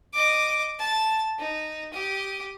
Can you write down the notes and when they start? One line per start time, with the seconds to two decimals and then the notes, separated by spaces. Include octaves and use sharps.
0.13 D#5 D6
0.80 A5
1.38 D#4
1.93 G4 D#6